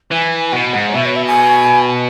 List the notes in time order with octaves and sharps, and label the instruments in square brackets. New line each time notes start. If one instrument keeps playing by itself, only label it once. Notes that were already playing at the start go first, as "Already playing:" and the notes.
[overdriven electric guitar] E3 [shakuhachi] G#5
[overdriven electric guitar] B2 [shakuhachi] F#5
[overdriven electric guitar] G#2
[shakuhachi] C#5
[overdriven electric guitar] B2 [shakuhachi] E5
[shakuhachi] C#5
E5
G#5